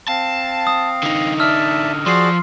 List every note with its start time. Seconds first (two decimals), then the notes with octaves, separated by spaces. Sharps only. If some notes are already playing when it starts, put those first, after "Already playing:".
0.08 C4 F5 A5
0.67 D#6
1.03 D3 D#4
1.40 D5 E5 A5 E6 F6
2.06 F3 F#4 G#4 D5 C6 C7